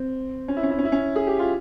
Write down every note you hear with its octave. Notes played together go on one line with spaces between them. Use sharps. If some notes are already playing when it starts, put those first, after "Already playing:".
Already playing: C4
C#4
E4
C#4
E4
C#4
E4
C#4
G#4
G4
F4